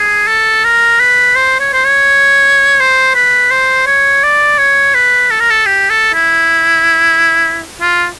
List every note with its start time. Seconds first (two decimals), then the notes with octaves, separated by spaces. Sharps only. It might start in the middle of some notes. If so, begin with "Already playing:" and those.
Already playing: G#4
0.28 A4
0.65 A#4
1.00 B4
1.36 C5
1.60 C#5
1.73 C5
1.84 C#5
2.80 C5
3.15 B4
3.51 C5
3.87 C#5
4.23 D5
4.58 C#5
4.95 B4
5.31 A4
5.40 A#4
5.50 A4
5.66 G4
5.90 A4
6.14 E4
7.81 F4